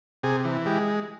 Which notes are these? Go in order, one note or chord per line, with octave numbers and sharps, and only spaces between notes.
C3 G#4
E3
G#3 G4